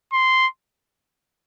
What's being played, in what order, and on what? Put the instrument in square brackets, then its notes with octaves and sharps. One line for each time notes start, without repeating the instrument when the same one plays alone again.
[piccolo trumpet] C6